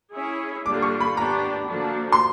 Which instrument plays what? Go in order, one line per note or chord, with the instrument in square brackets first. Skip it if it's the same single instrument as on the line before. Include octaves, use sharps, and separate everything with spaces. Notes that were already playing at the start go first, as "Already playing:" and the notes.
[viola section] C#4 E4 G#4 C#5 E5
[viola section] D3 G3 A#3 D4 F4 [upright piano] D6
[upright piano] C#6
B5
[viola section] B3 D4 G4 [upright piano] A#5
[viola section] D3 F3 A#3 D4 F#4
[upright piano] C6